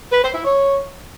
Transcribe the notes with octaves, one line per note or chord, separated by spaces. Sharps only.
B4
C5
E4
C#5